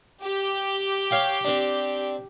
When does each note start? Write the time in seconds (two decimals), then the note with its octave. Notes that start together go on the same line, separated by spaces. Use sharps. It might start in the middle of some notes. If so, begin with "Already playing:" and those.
0.23 G4
1.11 C#5 F5 G5
1.45 C4 D4